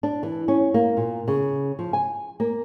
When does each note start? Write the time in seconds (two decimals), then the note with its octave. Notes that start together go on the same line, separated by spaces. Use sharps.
0.03 D4
0.23 E3
0.48 C#4
0.74 A#3
0.97 A#2
1.28 C#3
1.79 F3
1.93 G#5
2.40 A#3